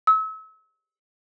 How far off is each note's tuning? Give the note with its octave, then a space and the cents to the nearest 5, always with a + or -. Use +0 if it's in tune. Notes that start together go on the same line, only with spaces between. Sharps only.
E6 -35